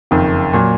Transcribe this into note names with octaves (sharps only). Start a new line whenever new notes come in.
F#1 F2 D#3
A#2 F#3